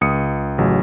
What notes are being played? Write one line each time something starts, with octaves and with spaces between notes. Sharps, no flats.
C#2 D#6 C#7
A1 C#3 F#3